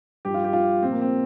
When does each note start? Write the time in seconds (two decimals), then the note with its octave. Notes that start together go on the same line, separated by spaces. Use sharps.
0.25 G2 F3 G4
0.34 F4
0.44 G4
0.53 F4
0.82 A#2 F3 C4
0.92 A#3
1.01 C4